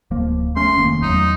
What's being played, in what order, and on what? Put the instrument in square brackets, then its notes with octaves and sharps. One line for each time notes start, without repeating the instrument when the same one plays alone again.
[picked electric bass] D1 F3 A#3
[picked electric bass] A3 C#4 [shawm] C6
[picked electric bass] F1 D#3 A#3
[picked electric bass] E2 F#3 A3 [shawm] D#4